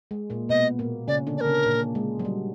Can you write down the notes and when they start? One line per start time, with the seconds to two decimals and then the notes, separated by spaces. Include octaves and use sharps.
0.11 G#3
0.30 A#2 A#3
0.49 B2 B3 D#5
0.79 A#2 A#3
1.08 C#3 C#4 D5
1.27 D3 D4
1.37 D5
1.41 A#4
1.47 C#3 C#4
1.66 A#2 A#3
1.95 G#3
2.19 F#3
2.25 G3